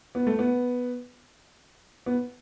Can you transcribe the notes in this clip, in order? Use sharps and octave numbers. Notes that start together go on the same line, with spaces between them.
B3
A3
B3
B3